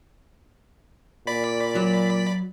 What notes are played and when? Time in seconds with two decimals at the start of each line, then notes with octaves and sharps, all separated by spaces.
1.27 A#2 D5 B5 B6
1.75 F#3